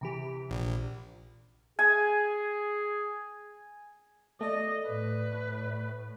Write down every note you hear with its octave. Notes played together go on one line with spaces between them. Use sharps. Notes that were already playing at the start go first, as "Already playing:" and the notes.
C3 E3 G4
A#1
G#4 G#5
A3 D5 D#5
A2 B4